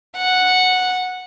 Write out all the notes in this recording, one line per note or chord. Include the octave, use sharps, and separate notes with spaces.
F#5